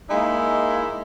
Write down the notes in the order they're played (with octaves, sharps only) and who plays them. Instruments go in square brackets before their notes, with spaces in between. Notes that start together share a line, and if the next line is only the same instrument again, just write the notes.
[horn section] G#3 A#3 D#4 E4